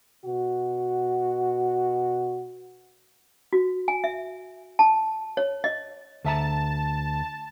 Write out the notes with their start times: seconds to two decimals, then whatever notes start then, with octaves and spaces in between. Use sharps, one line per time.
0.24 B2 F#4
3.53 F#4
3.88 G#5
4.04 E5
4.79 A5
5.37 C#5
5.64 D#5
6.25 D2 E5 A5 A#5